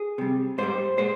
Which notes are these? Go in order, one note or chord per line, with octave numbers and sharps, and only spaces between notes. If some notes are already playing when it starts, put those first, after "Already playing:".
Already playing: G#4
C3 G3
G#2 G3 C5
A#2 G#3 C5